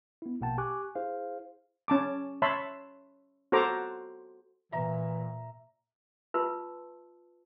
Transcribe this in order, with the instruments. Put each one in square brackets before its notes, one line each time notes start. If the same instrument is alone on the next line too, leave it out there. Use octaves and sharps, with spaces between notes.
[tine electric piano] B3 E4
A#1 B2 A#3 F#5 G5 A5
G4 G#5 C#6 D6 F#6
E4 G#4 C5 F5
[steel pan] C#4 A5 D6
C#5 E5 A5 B5 C6
F#4 A4 C5 A#5 D6
[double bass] A#2 [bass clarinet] E3 [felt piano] E5 A#5
[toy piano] F4 B4 E5 A5 C6 E6